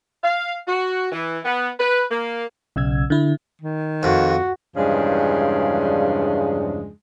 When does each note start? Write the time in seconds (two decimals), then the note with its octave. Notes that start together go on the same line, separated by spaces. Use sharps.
0.22 F5
0.67 F#4
1.11 E3
1.44 B3
1.79 B4
2.10 A#3
2.76 B1 C#3 E6 G#6
3.10 D3 E4
3.62 D#3
4.03 F2 F#4
4.76 E2 G2 C#3 F3 G#3 D4